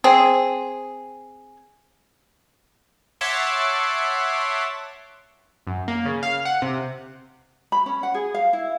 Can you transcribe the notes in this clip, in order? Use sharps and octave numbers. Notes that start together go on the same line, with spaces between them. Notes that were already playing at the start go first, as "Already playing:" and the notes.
C4 G#4
C#5 E5 F#5 A5 C6 D6
F#2
A#3
C#3
F5
F#5
C3
B5
C#4
F#5
G#4
F5
E4